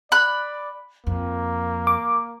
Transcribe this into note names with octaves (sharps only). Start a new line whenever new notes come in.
D5 B5 F#6
F2 A#3
D6